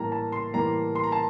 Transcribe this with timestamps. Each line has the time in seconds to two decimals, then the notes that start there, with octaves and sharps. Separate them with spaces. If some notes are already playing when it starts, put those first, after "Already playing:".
Already playing: A2 E3 G3 A#3 A5 A#5
0.12 A5
0.32 C6
0.54 A2 E3 G3 A#3 A#5
0.95 C6
1.03 A#5
1.12 A5